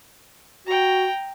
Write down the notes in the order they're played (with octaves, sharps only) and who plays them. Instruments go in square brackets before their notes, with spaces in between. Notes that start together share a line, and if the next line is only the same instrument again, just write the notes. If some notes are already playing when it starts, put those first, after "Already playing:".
[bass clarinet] F#4 [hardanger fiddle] G5 A#5